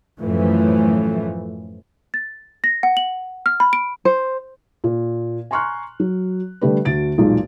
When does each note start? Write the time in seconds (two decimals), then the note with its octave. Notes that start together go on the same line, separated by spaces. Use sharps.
0.20 F#2 A2 E3 F3 A3
2.14 A6
2.64 A#6
2.83 F#5
2.97 F#7
3.46 F6
3.60 B5
3.73 D7
4.05 C5
4.84 A#2
5.51 G#5 A#5 C6 C#6 F6 F#6
6.00 F#3
6.61 D3 G3 A3 G4 B4
6.85 D2 F#4 A6 D7
7.18 E1 B1 A#2 G#3 D#4